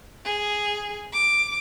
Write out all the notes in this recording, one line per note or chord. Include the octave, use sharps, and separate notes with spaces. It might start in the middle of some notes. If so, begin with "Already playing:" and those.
G#4
D6